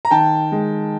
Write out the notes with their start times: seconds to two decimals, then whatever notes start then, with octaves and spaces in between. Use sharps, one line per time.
0.05 A#5
0.11 D#3 G5 A5
0.52 G#3